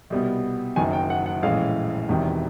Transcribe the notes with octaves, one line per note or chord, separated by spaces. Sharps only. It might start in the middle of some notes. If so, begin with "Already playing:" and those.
C2 B2 G3 B3
F#1 F#2 D#3 F#3 G#5
G5
F#5
F#5
A#1 A2 E3 G#3 C#4 F5
E1 E2 C3 D#3